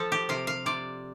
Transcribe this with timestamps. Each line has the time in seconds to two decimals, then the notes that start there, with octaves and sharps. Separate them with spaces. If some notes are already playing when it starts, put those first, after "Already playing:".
Already playing: F3 A4
0.12 G4
0.29 C3 F5
0.47 F5
0.66 C3 D5